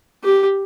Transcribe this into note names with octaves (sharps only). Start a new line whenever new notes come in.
G4